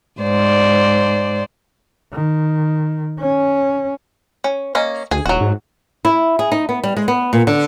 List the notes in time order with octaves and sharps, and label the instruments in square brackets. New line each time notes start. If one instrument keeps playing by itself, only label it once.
[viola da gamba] G#2 C5 D5
[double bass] D#3
C#4
[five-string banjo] C#4
A#3 C#4 D#5
[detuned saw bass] D2 [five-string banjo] G#4 G#5
[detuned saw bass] D#1 [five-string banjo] F#3 F#4
[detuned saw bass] G#2
[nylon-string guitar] E4
G#4
D#4
B3
G3
G#3
B3
A#2
D3